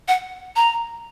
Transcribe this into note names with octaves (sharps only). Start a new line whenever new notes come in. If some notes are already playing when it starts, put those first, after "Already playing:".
F#5
A#5